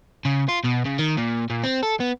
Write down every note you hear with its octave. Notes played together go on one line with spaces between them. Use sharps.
C#3
F4
B2
C#3
D#3
A#2
A#2
C4
A4
B3